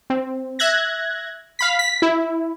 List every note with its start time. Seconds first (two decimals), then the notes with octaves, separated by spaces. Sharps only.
0.10 C4
0.59 E5 F#6 G#6 A#6
1.59 F5 B5 B6
1.79 B6
2.02 E4